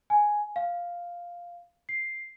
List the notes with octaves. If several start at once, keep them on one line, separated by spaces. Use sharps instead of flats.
G#5
F5
C7